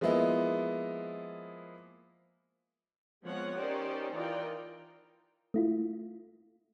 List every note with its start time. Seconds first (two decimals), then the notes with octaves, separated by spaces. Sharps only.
0.01 F3 G#3 A#3 B3 E4 D#5
3.25 F3 G#3 B3 C4 C#5 F#5
3.54 C#4 D#4 G4 A#4 C5 D5
4.14 E3 D#4 F4 A#4 D5 G5
5.54 A3 E4 F4